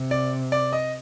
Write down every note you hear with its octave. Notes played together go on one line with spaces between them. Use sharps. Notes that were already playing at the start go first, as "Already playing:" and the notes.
Already playing: C3
D5
D5
D#5